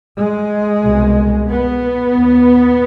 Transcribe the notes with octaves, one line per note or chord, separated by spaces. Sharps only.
G#3
C2 B2
B3
D#2